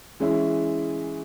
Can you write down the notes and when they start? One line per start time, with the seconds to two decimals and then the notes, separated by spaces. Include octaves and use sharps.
0.20 E3 G#3 C#4 E4